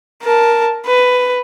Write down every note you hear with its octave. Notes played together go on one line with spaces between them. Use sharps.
A#4 A5
B4